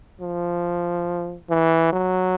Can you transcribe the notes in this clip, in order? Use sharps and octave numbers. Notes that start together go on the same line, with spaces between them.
F3
E3
F#3